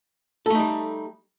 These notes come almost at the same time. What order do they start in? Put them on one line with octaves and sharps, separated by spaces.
A4 A3 D#4 G3